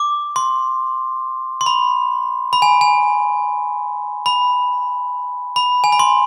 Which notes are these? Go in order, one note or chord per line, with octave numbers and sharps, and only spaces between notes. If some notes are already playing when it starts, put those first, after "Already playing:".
Already playing: D6
C6
C6
B5
B5
G#5
G#5
B5
B5
G#5
B5
C6